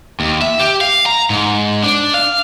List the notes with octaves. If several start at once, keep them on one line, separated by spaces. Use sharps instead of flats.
D#2
E5
G4
F5
A#5
G#2
D4
F5